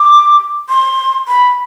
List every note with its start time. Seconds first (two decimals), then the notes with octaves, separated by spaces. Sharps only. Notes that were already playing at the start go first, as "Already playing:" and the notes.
Already playing: D6
0.69 C6
1.28 B5